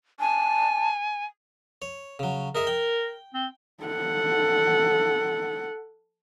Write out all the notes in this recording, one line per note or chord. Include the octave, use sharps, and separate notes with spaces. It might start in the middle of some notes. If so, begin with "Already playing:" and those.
G#5 A5
C#5
C#3 F#3
D#4 G#4 A#4 E5
G5
C4
A4 F#5